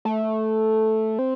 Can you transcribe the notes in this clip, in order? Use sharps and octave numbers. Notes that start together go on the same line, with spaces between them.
A3
C4